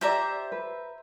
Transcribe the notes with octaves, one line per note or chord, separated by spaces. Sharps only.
G4 C5 D5 E5 A#5
B4